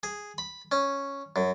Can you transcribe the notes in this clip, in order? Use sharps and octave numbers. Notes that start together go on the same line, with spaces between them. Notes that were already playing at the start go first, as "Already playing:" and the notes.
G#4
B5
C#4
F#2